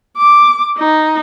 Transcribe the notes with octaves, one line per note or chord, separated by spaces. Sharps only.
D6
D#4